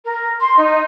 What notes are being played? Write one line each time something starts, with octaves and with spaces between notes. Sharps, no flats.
A#4
C6
D#4